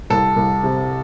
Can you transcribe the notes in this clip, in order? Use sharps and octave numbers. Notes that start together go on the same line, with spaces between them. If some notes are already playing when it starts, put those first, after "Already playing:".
C2 A4
C2
C3